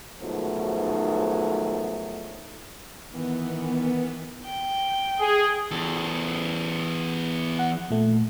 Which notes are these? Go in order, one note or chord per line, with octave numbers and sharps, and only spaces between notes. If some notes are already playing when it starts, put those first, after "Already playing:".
G#2 B2 D#3 F3 F#3 A3
D#3 E3 B3
G5
G#4
E2 A4
F#5
A#2 A3